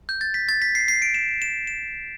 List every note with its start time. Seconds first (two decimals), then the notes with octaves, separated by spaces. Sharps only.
0.09 G6
0.21 A6
0.34 B6
0.49 A6
0.62 B6
0.75 C7
0.88 C7
1.02 D7
1.14 E7
1.42 E7
1.67 E7